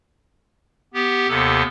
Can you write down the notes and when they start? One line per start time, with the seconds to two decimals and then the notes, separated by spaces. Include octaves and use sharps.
0.94 B3 G4
1.28 D#2 C3 B3 A4